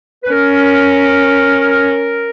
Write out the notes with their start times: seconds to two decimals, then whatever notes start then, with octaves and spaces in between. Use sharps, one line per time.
0.24 B4
0.31 C#4 A#4